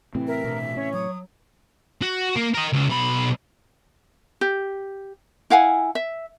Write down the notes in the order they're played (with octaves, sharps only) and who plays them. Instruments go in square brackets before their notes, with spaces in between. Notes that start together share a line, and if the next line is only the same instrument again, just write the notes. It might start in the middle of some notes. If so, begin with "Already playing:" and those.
[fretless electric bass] A2 C3 E3 [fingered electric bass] C4
[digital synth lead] A#4 [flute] E5
[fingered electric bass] B2 D4
[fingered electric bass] C#4 [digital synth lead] C#5
[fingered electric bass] F#3 [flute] D#6
[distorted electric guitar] F#4
A#3
A#4 D#5
C#2
B1 B5
[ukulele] G4
E4 F5 F#5 G#5
E5